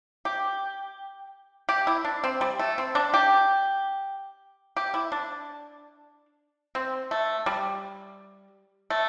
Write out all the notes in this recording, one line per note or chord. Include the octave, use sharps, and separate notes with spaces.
G4
G4
E4
D4
C4
G3
A3
C4
D4
G4
G4
E4
D4
C4
A3
G3
A3